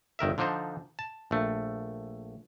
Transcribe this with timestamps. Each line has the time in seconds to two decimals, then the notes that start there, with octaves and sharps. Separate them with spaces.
0.19 G1 D#3 A#4 E5
0.38 D3 F3 D4 D#4 C5
0.99 A5
1.31 A#1 A3